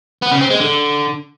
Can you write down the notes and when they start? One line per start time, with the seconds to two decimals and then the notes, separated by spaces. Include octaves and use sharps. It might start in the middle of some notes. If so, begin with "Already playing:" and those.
0.22 B3
0.32 C#3
0.41 C4
0.50 G#3
0.60 D3